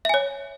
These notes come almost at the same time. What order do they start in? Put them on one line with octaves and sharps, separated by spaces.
E5 G#5 C#5